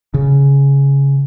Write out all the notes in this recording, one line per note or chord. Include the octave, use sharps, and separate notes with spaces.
C#3